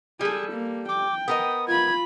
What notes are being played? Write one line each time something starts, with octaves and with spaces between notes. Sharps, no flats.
G3 G#4 A4
A#3
G5 D6
B3 A#4 D#5 D#6
F4 B5 G#6